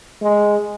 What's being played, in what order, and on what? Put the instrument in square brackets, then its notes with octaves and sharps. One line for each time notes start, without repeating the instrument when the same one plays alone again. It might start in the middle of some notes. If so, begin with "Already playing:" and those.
[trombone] G#3